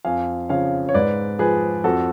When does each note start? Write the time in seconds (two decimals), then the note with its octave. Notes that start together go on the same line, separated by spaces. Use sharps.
0.05 F2 F5 G#5
0.49 C#3 F3 C#5 F5
0.89 C#5
0.94 G#2 B4 D5
1.39 F3 G#4 B4
1.84 F2 F#4 A4